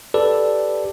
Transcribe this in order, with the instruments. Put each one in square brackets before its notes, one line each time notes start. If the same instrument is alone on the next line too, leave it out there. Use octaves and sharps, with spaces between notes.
[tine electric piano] G4 A4 B4 D5